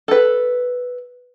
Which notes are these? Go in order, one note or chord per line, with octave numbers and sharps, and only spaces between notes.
A4 B4